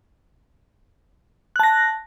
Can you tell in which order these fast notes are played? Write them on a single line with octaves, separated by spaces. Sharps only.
F#6 A5 A#6